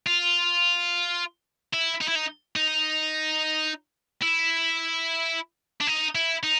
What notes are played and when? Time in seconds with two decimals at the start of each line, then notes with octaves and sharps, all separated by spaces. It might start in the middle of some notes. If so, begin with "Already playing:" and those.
0.07 F4
1.73 E4
2.01 D#4
2.08 E4
2.15 D#4
2.56 D#4
4.22 E4
5.81 D4
5.87 D#4
6.15 E4
6.43 D#4